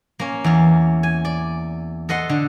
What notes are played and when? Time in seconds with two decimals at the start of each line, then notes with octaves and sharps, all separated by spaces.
0.19 A#3 C#4
0.44 E2 F5
1.03 G#5
1.25 D5
2.09 A4 D#5 F#5 C6
2.29 D3